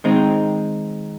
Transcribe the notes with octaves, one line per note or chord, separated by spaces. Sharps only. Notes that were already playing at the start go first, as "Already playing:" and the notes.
D#3 G#3 C4 D#4